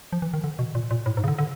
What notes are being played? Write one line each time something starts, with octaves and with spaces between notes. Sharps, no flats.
F3
E3
D#3
D3
B2
A#2
A#2
A2
G#2
C#3
D3
D3